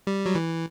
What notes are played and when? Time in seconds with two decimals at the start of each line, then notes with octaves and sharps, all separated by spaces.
0.07 G3
0.26 F#3
0.35 E3